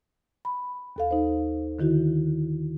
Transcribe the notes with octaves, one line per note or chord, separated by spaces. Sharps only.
B5
D#2 A4 F5
D#4 C5
D3 D#3 E4 F#4